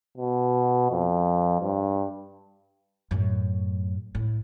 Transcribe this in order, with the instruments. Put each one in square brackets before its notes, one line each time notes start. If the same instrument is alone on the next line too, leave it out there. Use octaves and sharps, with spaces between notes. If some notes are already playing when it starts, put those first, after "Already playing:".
[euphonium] B2
F2
G2
[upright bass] F#2 A2
A2